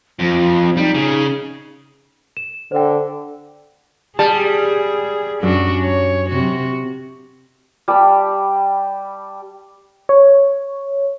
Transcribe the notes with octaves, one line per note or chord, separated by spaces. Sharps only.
F2 F3
G3 D#4
C#3 G#4
E7
D3 C5 G5
G3 G#4 A5
F#2 D4 F#4
C#5
C3 F#4
G3 G4 A5 B5
C#5